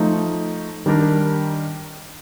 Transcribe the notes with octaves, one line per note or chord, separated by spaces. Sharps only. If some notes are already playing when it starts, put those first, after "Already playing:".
Already playing: F3 A3 D#4
D#3 G3 D4 G4 A#4